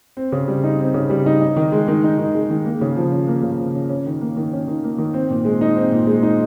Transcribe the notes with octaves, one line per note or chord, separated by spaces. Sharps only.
C4
C#3
G3
D#4
C4
C#3
G3
D#4
D#4
D#3
G#3
D#3
D#4
D#3
G#3
D#3
A#3
C#3
F3
C#4
A#3
C#3
F3
C#4
C#4
D#3
A#3
D#3
C#4
D#3
A#3
D#3
C4
A#2
G#3
D#4
C4
A#2
G#3
D#4